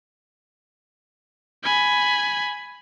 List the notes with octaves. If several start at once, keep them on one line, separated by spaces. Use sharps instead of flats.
G#5 B5